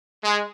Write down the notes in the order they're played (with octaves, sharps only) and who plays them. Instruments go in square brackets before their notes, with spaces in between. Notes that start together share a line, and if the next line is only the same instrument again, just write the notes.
[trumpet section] G#3